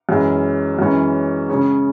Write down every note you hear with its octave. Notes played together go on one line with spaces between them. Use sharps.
F#2 E3 G#3
F#2 E3 G#3 C#4
C#3 G#3 C#4 G#4